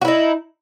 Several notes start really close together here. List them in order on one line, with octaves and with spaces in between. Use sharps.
F#4 E4 D#4